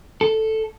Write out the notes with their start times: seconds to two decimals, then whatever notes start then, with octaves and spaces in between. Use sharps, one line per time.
0.21 A4